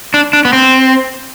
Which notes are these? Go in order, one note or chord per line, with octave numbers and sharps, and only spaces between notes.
D4
D4
B3
C4